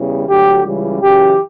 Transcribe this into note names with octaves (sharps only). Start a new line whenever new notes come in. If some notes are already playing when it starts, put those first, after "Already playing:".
Already playing: E2 C#3 E3 G3
D2 D3 F#3 G4
C#2 C#3 E3 G3
F#2 C#3 E3 G4